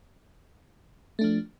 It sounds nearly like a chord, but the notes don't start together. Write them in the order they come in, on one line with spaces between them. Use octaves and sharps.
A3 D4 F3